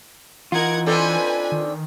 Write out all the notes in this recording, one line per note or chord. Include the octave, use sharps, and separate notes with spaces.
E3 D#4 F4 A#4 F#5 G#6
C4 D4 A4 B4 G#5
D#3